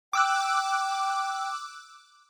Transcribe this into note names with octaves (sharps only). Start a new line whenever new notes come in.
G5 D6 E6 F#6